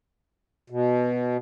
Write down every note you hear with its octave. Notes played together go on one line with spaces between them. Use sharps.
B2